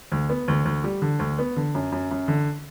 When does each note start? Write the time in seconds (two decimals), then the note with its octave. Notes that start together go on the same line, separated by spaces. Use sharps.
0.12 D2
0.30 B3
0.48 D2
0.65 D2
0.84 G3
1.02 D3
1.19 D2
1.39 B3
1.56 D3
1.75 F#2
1.92 F#2
2.11 F#2
2.28 D3